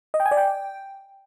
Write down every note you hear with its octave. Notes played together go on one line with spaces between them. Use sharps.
D#5
G5
G#5
D5
G5